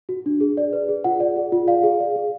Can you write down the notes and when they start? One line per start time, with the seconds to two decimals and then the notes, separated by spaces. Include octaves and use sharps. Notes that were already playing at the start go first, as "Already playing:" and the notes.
0.09 F#4
0.26 D4
0.41 G#4
0.57 D5
0.73 B4
0.89 G#4
1.04 F4 F#5
1.20 D5
1.36 G#4
1.52 F4
1.68 D5 F5
1.83 G#4
2.00 D5
2.16 G#4